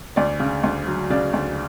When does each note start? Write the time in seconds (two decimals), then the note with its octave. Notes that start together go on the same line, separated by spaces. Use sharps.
0.16 D2 D5
0.40 C#3
0.63 D2
0.87 F#3
1.10 C#3 D5
1.34 D2